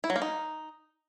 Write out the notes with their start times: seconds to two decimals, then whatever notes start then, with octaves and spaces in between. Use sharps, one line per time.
0.04 E4
0.10 F#3
0.16 A#3
0.22 D#4